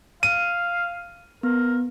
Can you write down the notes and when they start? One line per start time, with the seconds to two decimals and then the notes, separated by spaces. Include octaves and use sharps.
0.23 F5 D#7
1.43 B3 A#4